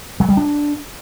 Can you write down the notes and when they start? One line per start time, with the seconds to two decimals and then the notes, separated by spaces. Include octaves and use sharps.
0.20 F#3
0.29 G3
0.37 D4